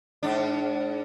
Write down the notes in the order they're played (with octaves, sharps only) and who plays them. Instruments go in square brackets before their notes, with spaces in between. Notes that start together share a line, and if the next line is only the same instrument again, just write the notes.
[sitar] G#2 D4